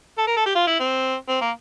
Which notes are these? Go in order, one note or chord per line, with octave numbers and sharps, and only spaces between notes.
A4
A#4
A4
G4
F4
E4
C4
C4
A#3